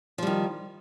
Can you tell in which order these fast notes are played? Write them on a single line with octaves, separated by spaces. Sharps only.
F3 G3 D#3